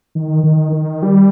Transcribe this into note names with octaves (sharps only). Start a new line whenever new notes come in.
D#3
D#3
D#3
G3